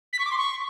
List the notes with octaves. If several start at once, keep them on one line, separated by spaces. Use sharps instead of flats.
B6
C#6
D6
C6
C#6